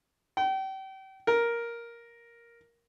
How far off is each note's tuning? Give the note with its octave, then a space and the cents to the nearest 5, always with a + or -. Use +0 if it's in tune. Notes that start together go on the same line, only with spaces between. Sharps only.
G5 -35
A#4 +5